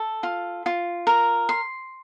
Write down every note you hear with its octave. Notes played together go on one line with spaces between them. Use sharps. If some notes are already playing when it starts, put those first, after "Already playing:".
Already playing: A4
F4
F4
A#4
C6